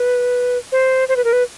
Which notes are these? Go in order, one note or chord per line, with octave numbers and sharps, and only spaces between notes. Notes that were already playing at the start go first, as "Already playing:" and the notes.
Already playing: B4
C5
C5
B4
A#4
B4